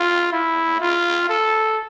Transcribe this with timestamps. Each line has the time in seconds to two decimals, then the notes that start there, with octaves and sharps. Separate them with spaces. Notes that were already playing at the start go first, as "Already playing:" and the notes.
Already playing: F4
0.32 E4
0.81 F4
1.29 A4